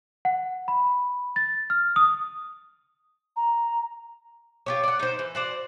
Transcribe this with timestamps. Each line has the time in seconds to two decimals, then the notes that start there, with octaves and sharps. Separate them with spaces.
0.25 F#5
0.68 B5
1.36 A6
1.70 F6
1.96 D#6
3.36 A#5
4.66 F4 G4 C#5
4.84 D5 F#5
4.99 D#4 C5
5.19 E3
5.35 F#4 C5 D5